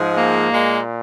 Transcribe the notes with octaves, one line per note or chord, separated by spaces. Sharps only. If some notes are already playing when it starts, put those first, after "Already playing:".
Already playing: G#2 F3 G#3
A#3
A#2 G#3